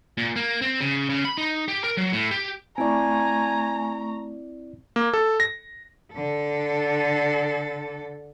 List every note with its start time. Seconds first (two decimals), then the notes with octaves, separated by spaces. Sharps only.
0.17 A#2
0.36 A#3
0.62 C4
0.80 C#3
1.09 C#3
1.25 B5
1.37 D#4
1.68 G4
1.84 A#4
1.97 F#3
2.13 A2
2.31 G4
2.78 A3 C4 E4 D5 G#5 A#5 C#6
4.96 A#3
5.13 A4
5.40 A#6
6.13 D3 A4